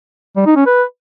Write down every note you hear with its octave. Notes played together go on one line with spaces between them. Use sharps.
G3
D#4
C#4
B4